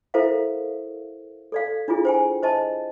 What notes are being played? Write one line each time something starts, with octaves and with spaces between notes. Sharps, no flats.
E4 A4 A#4 C5 E5 F5
A4 D5 F5
D4 E4 F4 G#4
C5 G5 G#5
C5 D#5 A5